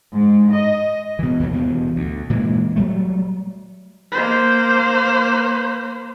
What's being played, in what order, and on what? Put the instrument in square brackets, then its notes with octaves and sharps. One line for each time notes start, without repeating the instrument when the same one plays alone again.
[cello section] G#2
D#5
[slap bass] B2 E3
D#2 E3 F#3
G2 B2 E3
D2
A#2 E3 G#3
F#3 G3 A3
[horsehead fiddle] A#3 C5